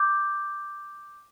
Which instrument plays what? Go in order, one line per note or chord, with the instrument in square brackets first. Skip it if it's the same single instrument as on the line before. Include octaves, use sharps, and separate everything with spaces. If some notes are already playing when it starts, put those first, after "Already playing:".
Already playing: [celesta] D6 G6